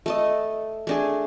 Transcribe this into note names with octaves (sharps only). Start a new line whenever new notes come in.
A3 A4 D#5
A3 D4 G#4